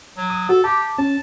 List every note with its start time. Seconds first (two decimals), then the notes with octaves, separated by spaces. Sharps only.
0.17 F#3
0.30 D#6
0.49 F#4 A4
0.64 G4 A5 D6
0.99 C#4 A5